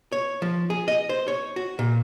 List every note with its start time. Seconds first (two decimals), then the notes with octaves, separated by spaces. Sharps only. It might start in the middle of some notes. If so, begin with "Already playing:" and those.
0.12 C#5
0.42 F3
0.70 G#4
0.88 D#5
1.09 C5
1.28 C#5
1.56 F#4
1.79 A#2